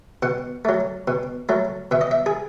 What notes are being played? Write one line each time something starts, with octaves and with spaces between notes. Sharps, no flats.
B2 F#5
F#3 A3
B2
F#3 A3
B2 E5
D#5
E5
G#4